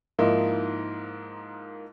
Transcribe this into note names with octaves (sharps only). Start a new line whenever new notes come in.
G#2 F3 A#3 D#4 E4